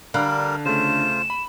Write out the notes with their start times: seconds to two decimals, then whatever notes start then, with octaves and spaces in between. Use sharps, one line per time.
0.14 D3 G3 A#4 F5 B5 F#6
0.65 C#3 A3 F4 C5 E7
1.30 B5